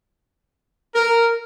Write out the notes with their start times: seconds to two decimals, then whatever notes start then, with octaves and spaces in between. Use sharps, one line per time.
0.95 A#4